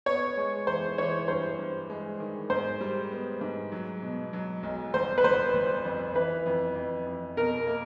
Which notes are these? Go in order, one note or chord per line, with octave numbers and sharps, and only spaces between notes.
B3 C#5
G#3
E3 C5
E3 C#5
G2 C5
G2
G#3
D#3
G#2 C5
G3
B3
G#2
F#3
B2
F#3
B1
G1 C5
B4
G1 C5
G1
F2
E3 B4
F2
F2
F2
B2 A#4
A#3